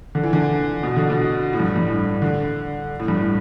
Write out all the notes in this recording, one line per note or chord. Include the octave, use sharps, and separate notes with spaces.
D3
E3
D3
B2
D3
B2
A2
G2
G2
A2
D3
A2
G2
A2